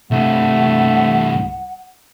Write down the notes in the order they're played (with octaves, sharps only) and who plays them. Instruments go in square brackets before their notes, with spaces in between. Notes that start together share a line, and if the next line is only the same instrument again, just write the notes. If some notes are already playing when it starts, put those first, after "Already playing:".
[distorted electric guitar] C2 G2 [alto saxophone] A3 [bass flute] F#5